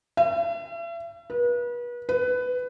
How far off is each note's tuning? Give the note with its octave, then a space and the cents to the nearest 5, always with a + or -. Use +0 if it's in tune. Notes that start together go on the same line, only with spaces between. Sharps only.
E5 +40
B4 -35
B4 +15